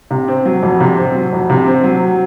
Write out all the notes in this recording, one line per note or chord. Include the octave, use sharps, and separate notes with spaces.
C3
C4
F#3
F2
C3
C4
F#3
F2
C3
C4
F#3